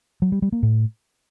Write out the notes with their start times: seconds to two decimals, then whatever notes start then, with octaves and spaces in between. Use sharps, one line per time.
0.22 F#3
0.32 G3
0.42 G3
0.52 A#3
0.63 A2